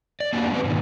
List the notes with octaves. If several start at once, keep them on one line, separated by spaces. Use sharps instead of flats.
D5
A#3 B3 D4 F#4 G4
G#3 C4 G4 A4 B4
G#2 B2 D#3